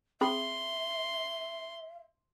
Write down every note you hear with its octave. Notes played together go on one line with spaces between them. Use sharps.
C4 G#4 E5 B5 C6